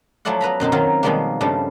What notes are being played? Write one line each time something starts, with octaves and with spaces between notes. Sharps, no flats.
F3 F#3 A3 E4 D5 F#5
B3 B4 A#5 B5
F#2 B2 C4 D#4
D#3 F#3 C4 D#4 F4 A#4
B2 D#3 F3 G3 G#3 A#3
G2 C#3 F3 G3 A3